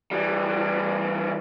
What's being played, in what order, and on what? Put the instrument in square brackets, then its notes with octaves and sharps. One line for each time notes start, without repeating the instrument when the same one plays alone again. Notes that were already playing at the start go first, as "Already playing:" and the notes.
[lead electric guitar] E3 G3